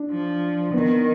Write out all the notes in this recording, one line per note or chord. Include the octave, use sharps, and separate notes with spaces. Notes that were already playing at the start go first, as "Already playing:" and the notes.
Already playing: D4
F3
D#3 B3